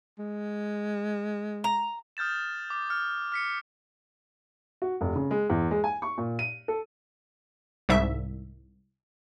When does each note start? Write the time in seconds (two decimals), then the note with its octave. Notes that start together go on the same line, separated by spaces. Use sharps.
0.19 G#3
1.64 A#5
2.17 D#6 F6 G6 A6 E7
2.70 D6
2.90 F6
3.32 F6 B6 C#7
4.82 F#4
5.01 F1
5.16 C#3
5.31 G#3
5.50 E2
5.71 G#3
5.84 G#5
6.02 C#6
6.18 A#2
6.39 D#7
6.68 A4
7.89 C2 G#2 E5